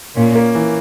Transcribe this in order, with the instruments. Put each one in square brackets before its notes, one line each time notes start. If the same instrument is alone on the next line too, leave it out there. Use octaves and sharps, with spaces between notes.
[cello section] A#2 [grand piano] C#4
[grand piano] A#3
E3